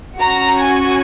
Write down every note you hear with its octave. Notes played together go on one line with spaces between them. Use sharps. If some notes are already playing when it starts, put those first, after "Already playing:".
C#4 F#4 A#5
G#5